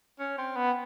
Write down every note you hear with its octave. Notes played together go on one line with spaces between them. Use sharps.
C#4
C4
B3